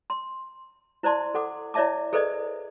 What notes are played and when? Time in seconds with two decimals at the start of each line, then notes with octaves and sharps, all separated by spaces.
0.10 C6
1.03 E4 C5 D5 A5 C6
1.34 A4 F#5 D6
1.74 E4 C#5 D5 E5 A5 D6
2.13 G#4 A4 B4 C5 D5 D#5